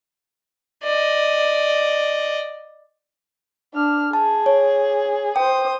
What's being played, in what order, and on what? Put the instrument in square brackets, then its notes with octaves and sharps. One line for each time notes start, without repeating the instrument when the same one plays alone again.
[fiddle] D5 D#5
[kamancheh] D4 F6
[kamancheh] G#4 [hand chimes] A5
[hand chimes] C#5
[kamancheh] C5 D#6 [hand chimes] G5